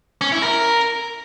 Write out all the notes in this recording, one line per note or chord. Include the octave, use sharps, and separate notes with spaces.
C#4
E4
A#4